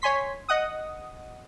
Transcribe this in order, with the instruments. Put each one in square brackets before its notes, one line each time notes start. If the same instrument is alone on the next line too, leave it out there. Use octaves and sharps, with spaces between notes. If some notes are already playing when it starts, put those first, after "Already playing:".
[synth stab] C#5 G#5 C6 B6
D#5 F#5 D#6